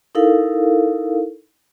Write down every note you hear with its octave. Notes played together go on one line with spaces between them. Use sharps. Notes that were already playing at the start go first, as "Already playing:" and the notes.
D#4 E4 A4 A#4 F5